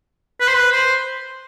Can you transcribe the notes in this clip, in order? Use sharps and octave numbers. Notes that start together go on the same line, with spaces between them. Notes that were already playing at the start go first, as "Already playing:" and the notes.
B4
C5
B4
C5